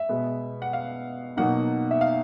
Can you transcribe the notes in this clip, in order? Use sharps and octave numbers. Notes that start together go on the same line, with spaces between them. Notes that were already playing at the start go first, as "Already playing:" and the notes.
Already playing: E5
B2 G#3 B3
F#5
F5
B2 F#3 A#3 D#4 F#5
E5
F5